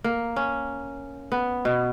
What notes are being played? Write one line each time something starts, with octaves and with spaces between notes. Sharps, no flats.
A#3
C#4
B3
B2